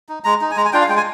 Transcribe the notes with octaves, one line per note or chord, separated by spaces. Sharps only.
D#4
G#3 A#5
D#4
G#5
G#3 A#5
G#5
D4 F4 G5
F5
G#3 G5
G#5